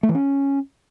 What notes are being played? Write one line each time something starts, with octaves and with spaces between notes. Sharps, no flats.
A3
E3
C#4